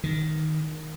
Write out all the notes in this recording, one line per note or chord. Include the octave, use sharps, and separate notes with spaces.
D#3